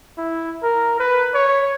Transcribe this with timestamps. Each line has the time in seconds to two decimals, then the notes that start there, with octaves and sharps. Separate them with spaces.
0.18 E4
0.63 A#4
1.00 B4
1.34 C#5